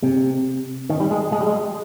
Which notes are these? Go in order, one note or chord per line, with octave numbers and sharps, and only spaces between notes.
C3
D#3
G3
G#3
G#3
G3
G#3